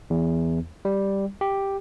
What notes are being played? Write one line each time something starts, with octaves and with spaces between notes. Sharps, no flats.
E2
G3
G4